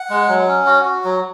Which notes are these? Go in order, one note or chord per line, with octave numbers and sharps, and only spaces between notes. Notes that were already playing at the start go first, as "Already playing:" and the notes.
Already playing: F#5
G#3
F#3
C#4
F#4
F#4
F#3